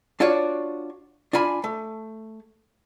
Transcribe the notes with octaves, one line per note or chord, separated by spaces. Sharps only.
D4 F4 F#4 C#5 D5
D4 F4 G#5 B5
A3